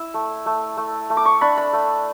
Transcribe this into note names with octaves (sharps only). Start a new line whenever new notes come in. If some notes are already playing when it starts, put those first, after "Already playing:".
Already playing: E4 E6
A3
A3
A3
A3
D6
C#6
D4 B5
B5
A3